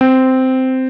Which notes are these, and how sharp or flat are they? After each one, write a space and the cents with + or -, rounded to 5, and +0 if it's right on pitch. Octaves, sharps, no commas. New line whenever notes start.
C4 -10